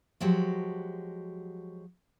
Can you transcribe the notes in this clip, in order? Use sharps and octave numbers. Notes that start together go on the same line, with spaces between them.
F3 F#3 G#3 F#4 G4